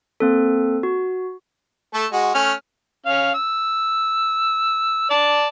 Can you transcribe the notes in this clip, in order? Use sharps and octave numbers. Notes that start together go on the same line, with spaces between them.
A#3 C4 A4
F#4
A3 A4
G#3 F#4
A3 C#4 F6
C#4 F5
E6
D5 A5